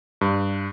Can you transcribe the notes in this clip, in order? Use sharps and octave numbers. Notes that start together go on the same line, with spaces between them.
G2